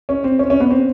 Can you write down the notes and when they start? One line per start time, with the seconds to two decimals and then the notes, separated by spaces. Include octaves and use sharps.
0.09 C#4
0.24 C4
0.39 C#4
0.50 C#4
0.60 B3
0.71 C4